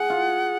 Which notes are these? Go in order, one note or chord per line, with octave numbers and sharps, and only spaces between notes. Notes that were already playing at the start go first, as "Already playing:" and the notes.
Already playing: G#4 F#5
F4